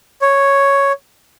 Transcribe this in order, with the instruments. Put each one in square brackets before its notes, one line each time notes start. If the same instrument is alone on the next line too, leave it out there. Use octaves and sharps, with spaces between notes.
[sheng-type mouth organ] C#5